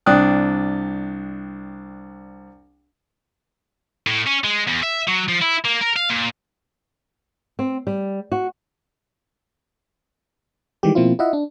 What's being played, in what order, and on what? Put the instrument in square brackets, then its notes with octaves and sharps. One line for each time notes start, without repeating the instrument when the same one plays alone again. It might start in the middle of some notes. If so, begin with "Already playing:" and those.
[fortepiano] C2 D4 G5 D#6 F#6
[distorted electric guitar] A2
C#4
G#3
E2
E5
F#3
F3
E4
A#3
A#4
F5
A#2
[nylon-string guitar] C4
G3
F#4
[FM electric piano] D#3 E3 G3 G#3 G4
B2 F3 A#3 C4 E4 F4
E4 F4 D#5 E5 F#5
D4